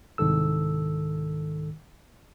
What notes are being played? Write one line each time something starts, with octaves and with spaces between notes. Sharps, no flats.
C2 G#2 D#3 A4 E6